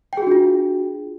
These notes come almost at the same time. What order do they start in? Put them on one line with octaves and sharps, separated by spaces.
G5 G#4 F#4 D4 F4